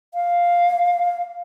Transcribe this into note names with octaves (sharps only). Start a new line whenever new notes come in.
F5